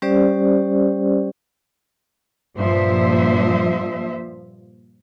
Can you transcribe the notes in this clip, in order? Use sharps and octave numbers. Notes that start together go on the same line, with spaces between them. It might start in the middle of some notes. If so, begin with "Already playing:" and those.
G3 C#4 G4 C5 D5
G2 A#2 F3 C5 E5